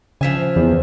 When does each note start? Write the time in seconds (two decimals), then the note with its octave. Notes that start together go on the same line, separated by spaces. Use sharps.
0.21 C#3 F3 E5 G#5
0.56 E2